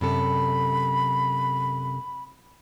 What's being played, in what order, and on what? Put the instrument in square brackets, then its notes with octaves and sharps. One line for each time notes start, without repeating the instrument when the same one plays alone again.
[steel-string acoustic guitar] F#2 C3 A4 [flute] B5